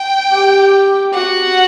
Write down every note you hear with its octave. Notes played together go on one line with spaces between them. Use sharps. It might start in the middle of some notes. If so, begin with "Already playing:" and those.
Already playing: G5
G4
F#4 F#5